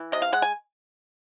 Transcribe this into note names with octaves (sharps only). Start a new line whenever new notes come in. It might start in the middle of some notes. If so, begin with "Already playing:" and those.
Already playing: E3
C3 D#5
F5
G#3 F#5
G#5